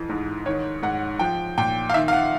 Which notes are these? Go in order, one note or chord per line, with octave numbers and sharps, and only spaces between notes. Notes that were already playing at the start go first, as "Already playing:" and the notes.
Already playing: F2 E3
G#2
D#3 C#5
G#2 F#5
F3 G5
A#2 G5
F5
D#3 E5
F5
F#5